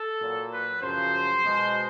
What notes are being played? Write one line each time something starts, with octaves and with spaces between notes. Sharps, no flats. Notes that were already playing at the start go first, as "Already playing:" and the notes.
Already playing: A4
A#2 F#3
B4
F#2 C#3 F3 C5
B2 G#3